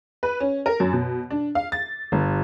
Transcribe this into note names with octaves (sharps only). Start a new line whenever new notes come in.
B4
C#4
A#4
F#2
B2
D4
F5
A6
G1